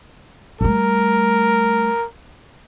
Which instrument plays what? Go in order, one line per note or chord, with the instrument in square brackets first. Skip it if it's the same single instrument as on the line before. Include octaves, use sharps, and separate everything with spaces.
[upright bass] G3 A3 [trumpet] A#4